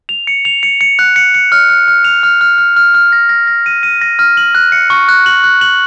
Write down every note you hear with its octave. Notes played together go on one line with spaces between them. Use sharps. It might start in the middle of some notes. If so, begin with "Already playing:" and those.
F7
C#7
F7
C#7
C#7
F#6
C#7
C#7
F6
F6
F6
F7
F6
F6
F6
F6
F6
A#6
A#6
A#6
D#7
D#7
A#6
F6
F#7
F#6
C#7
C#6
F#6
F#7
F#6
F#7